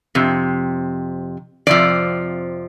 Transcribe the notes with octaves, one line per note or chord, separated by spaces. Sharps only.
F2 C3
F2 C3 F3 D5